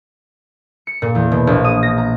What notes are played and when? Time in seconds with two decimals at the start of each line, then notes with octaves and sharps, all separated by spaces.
0.87 C#7
1.02 A#2
1.15 E2
1.32 B2
1.47 A#1
1.65 D#6
1.83 A#6
1.98 A#5